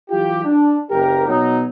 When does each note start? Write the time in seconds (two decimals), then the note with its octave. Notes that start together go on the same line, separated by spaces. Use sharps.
0.10 E3 F#3 F4 G4
0.45 D4
0.91 F#1 G4 A#4
1.28 B2 F#3 D#4